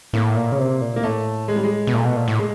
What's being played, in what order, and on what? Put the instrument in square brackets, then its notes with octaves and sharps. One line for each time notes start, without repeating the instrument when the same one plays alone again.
[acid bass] A2 [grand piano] A#3
[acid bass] A#2
C#3
C3
A#2
[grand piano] A#3
[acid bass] A2 [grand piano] A3
[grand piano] G#3
G3
G#3
[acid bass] B2
[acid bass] A#2 [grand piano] A3
[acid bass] B2
A#2
A2
[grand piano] G#3